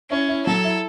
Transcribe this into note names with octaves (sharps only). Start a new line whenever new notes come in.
C#4 E4
E4
F#3 A4
E4